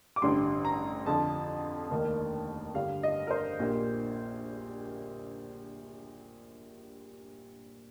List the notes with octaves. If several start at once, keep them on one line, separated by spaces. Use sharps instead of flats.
D6
A1 G2 D3 G3 C6
A#5
F2 D3 F3 A5
F1 D#2 D#3 A#3
G2 D3 G3 F5
D#5
A#4
C5
A#1 A#2 G3 A#3